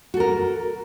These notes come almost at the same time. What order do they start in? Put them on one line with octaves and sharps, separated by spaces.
F#4 A4 A#4